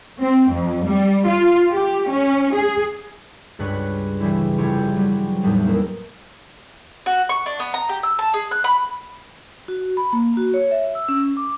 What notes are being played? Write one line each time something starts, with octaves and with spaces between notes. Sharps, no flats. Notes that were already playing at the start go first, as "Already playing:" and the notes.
C4
F2
G3
F4
G4
C#4
G#4
C#2 G2 B4 C#5 F#6 B6
C#3 E3 G3 E4
F1 E4 G4 C5 C#5
F#3 G3
E2 A2 G3 B3 D#4
A#3 C4 E4 A#4
F#4
C#6
D4
B3
A#5
G4
E6
A5
G#4
F#6
B5
F#4
B5
A#3
F#4
C#5
E5
E6
C#4
D6